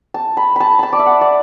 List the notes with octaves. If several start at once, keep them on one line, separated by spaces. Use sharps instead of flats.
A5
B5
A5 B5
A5 B5
D5
E5
F#5
D5